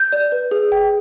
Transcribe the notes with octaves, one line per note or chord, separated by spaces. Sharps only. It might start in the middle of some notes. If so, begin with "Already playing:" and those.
Already playing: G6
D5
B4
G#4
G5